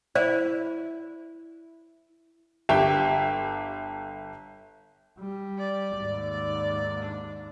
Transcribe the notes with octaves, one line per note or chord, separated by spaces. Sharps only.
E4 C5 D5
G1 G4 E5 G5
G3
D5
D#2 G#2
D5
D4